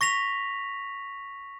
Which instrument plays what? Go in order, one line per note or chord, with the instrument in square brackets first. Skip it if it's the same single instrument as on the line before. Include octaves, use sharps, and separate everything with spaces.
[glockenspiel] C#6 A#6 B6 F7